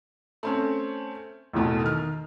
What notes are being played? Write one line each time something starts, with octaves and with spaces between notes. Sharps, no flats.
A3 C4 C#4
A1 E2 B2 A3
D#3 F6